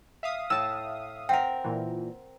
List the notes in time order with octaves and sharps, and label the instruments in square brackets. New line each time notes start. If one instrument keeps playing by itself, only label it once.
[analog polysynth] E5 F5 D#6
[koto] A2 A5 [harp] E6
[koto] C4 A#4 [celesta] F#5 G5
[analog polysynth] A#2 E3